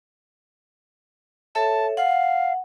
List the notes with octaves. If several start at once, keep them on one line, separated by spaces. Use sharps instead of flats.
A4 C#5 E5 A5
F5 F#5